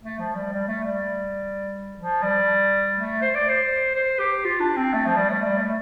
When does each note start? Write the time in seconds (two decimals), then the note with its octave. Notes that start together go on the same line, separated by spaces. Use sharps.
0.03 A3
0.19 F3
0.35 G3
0.52 G3
0.68 A3
0.84 G3
1.99 F3
2.23 G3
2.97 A3
3.22 C5
3.34 D5
3.48 C5
3.95 C5
4.19 G4
4.44 F4
4.60 D4
4.77 C4
4.93 A3
5.06 F3
5.17 G3
5.30 A3
5.42 G3
5.58 A3